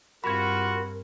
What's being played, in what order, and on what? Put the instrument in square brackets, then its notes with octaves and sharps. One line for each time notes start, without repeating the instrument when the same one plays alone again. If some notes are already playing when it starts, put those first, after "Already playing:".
[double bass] G2 C4 [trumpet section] F4 F#4 [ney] A#4 [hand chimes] B5 G#6